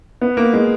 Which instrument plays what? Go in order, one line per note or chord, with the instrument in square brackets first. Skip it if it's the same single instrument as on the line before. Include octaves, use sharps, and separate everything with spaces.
[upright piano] B3
A#3
G#3